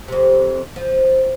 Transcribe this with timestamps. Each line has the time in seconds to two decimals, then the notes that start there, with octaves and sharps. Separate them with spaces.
0.08 F2 C3
0.76 F3